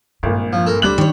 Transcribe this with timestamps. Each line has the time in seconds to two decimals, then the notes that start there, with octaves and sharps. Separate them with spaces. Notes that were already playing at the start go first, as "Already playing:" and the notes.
0.23 G#1 G2 A#2
0.53 F3
0.66 A4 A#4
0.82 D2 G3 D4 C5 B5 F#6 F#7
0.98 D#3 C#5